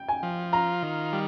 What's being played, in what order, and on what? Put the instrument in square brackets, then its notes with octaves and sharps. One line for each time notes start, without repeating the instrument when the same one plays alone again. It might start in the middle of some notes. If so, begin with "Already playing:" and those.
Already playing: [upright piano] G5
G#5
[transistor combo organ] F3
[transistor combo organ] F4 [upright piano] A#5
[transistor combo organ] D#3
G3